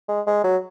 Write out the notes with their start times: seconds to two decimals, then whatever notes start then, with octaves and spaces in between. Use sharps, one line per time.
0.09 G#3
0.27 G#3
0.44 F#3